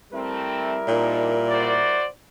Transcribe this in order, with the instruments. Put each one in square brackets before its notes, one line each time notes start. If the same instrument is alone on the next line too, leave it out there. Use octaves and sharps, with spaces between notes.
[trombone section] G3 E4 A#4 [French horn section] A3 C4
[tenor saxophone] A#2 [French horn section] C4 D4 D#4
[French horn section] F#4 C5 D5